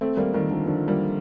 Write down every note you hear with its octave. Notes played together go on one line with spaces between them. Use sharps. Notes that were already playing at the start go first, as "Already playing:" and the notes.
A3 C4
G3 A#3
D#3 G3
D3 F3
D3 F3
G3 A#3